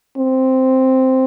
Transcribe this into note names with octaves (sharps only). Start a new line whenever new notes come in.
C4